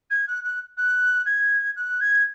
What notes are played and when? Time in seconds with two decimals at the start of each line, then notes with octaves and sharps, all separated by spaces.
0.10 G#6
0.27 F#6
0.44 F#6
0.77 F#6
1.26 G#6
1.76 F#6
2.00 G#6